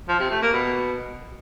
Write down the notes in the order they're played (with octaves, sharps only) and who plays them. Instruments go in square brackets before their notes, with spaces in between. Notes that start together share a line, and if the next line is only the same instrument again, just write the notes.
[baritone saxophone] F3
C3
A3
A#3
B2